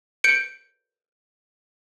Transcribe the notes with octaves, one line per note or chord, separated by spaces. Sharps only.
G6 C#7 D7